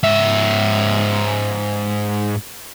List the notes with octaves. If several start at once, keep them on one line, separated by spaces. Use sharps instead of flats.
G#2 E5